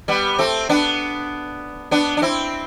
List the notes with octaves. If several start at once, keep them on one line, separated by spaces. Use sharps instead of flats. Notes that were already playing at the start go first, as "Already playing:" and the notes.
G3 B3
A3 C4
B3 D4
B3 D4
D4
C4 E4